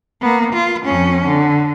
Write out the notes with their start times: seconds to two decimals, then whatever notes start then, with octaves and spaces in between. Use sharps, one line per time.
0.21 A#3 B3
0.53 F4
0.85 F2 C#4
1.26 D3